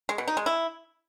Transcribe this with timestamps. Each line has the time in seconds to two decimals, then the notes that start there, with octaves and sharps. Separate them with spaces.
0.09 G#3
0.18 B2
0.28 D#4
0.37 G#3
0.46 E4